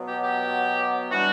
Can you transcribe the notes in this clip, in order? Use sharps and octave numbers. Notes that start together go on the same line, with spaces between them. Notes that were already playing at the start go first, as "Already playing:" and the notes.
Already playing: B2 F#3 B3
G4
G4
E3 G3 D4 F#4